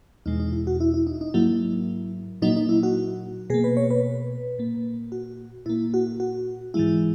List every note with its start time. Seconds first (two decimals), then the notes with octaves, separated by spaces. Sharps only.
0.26 E2 B2 G#3 D#4
0.40 D#4
0.53 E4
0.67 F#4
0.80 E4
0.94 E4
1.07 D#4
1.21 D#4
1.34 G#2 F#3 A#3 E4
2.42 A#2 F#3 A#3 D#4
2.56 D#4
2.69 E4
2.83 F#4
3.50 B2 A#3 G#4
3.64 B4
3.77 C#5
3.90 B4
4.59 A#2 A#3
5.12 F#4
5.66 A#2 A#3 E4
5.94 F#4
6.20 F#4
6.74 G#2 E3 G#3 E4